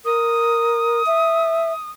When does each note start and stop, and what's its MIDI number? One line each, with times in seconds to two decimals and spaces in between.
0.05 1.03 70
0.05 1.90 87
1.06 1.73 76